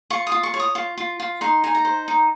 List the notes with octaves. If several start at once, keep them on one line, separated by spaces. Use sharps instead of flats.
F4 C#6
D#6
F4
C#6
C#5
D#6
F4
F4
F4
D#4 C6
D#4 G#5
A#5
C5
D#4